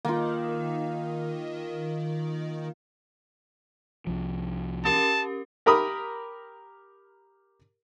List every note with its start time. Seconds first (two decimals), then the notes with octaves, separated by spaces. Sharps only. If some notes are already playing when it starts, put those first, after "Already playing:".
0.05 D#3 A#3 F4
4.07 C2 F3
4.85 C#4 G4 A#4 A5
5.66 G4 A#4 A#5 B5 D#6